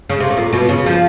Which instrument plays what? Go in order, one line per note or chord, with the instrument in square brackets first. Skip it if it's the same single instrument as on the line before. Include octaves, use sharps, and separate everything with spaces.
[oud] C#3
C3
A2
A#2
B2
C#3
F3